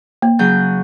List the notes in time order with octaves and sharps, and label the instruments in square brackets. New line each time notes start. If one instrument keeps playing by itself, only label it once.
[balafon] A#3
[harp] C#3 F#3 G6